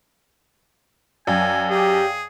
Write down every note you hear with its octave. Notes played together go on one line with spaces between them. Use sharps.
F#2 D5 F5 G5 G#5
G4 G#4